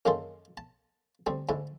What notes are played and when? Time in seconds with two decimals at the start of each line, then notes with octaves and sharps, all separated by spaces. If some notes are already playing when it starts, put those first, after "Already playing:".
0.05 F#2 D#3 A#3 G#4 A4 C6
0.57 A5
1.26 D2 G3 C4
1.49 D2 G#2 E4